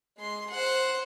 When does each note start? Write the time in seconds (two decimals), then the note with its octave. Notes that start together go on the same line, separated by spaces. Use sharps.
0.18 G#3 C6
0.50 C5 F#5